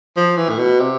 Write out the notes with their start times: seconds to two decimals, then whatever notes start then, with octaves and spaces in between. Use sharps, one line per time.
0.16 F3
0.37 E3
0.49 A2
0.59 B2
0.80 C3